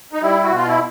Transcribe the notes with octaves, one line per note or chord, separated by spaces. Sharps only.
D#4
G3 E4
F#4
B2
F4
E4